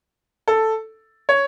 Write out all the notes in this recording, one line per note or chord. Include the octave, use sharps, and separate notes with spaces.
A4
C#5